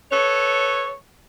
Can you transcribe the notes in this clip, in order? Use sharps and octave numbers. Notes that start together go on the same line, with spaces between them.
A4 B4 C#5